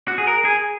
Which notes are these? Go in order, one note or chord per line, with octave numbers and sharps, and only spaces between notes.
F#4
G#4
A#4
G#4